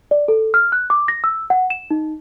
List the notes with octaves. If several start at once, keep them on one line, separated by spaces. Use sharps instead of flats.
D5
A4
F6
F#6
D6
A#6
E6
F#5
E7
D#4